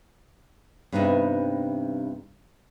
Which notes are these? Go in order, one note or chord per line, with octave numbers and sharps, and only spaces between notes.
G2 C3 B3 C#4 D#4 E4